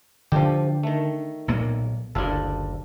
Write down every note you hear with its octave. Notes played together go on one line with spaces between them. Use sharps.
D3 F3 D4 G4
D#3 A3
B1 A#2 A#3
F#1 D2 A2 D4 F4 A4